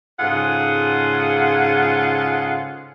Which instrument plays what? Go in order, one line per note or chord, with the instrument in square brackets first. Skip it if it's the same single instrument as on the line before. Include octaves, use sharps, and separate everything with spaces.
[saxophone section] G#2 C#3 F4 G#4 A4 F#5